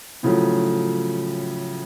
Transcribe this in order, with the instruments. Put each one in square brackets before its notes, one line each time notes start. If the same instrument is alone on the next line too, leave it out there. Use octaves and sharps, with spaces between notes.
[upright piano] A2 C#3 F3 F#3 A3